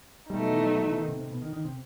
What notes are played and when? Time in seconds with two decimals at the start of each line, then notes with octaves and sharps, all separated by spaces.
0.30 B2 G3 A3 D#4
0.42 F#3
0.53 E3
0.64 F#3
0.75 F#3
0.86 E3
0.98 D#3
1.08 C3
1.20 C3
1.31 B2
1.42 D#3
1.53 D#3
1.65 C3